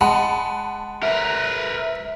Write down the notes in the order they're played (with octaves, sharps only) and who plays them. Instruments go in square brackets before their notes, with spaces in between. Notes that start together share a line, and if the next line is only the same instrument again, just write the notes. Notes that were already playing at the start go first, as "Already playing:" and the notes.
[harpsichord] G#3 [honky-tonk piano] F#5 A5 B5
[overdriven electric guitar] A#4 B4 [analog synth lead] E5